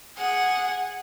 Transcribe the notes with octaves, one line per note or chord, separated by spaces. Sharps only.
G#4 F#5